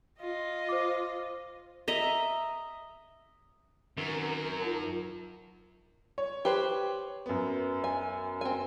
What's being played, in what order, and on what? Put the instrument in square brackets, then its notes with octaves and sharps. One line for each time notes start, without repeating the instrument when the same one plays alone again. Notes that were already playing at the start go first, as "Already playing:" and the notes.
[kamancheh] F4 D#5
[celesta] C5 D6
[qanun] D#5 E5 A#5
[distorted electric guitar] F#2 [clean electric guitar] D#3 C4 B4 [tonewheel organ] A#4
[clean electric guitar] D#4 F4 A5
[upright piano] C#5
[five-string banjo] G4 B4 C5
[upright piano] F#2 B3
[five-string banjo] G#5
C4 G#5